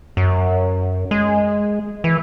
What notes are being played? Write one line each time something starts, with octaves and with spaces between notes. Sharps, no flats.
F#2
G#3
E3